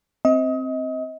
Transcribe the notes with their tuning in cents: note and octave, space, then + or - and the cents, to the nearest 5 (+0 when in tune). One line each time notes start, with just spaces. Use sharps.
C4 +0 D#5 +30